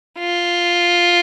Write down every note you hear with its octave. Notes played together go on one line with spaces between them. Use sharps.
F4